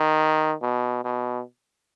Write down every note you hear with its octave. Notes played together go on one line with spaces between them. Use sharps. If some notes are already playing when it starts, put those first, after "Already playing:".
Already playing: D#3
B2
B2